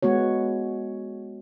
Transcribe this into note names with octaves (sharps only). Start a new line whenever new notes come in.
G#3 B3 F#4 C#5